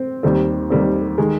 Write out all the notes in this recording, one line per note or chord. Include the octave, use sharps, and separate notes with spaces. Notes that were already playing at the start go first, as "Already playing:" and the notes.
Already playing: C4
D#2 D#3 G3 C4
D#2 D#3 G3 C4
D#3 G#3